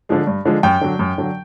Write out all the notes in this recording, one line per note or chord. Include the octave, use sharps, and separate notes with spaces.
D3 F3 G#3
G2
D3 F3 G#3
F#2 G5
D3 F#3
F#2
D3 F#3